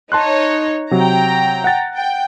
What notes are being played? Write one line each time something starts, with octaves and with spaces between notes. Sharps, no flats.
D#4 C#5 A5 C6 F#6
C3 F#3 G5 A#5
F#5 A6
G5